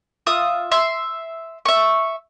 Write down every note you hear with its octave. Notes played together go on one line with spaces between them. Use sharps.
F4 E5 D#6
E5 C6
E5 C#6